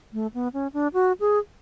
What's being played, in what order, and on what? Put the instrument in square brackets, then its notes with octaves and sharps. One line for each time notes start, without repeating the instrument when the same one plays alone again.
[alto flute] A3
B3
C#4
D4
F#4
G#4